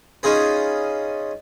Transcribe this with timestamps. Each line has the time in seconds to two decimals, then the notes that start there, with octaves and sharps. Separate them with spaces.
0.23 C#4 D#4 F4 G#4 B4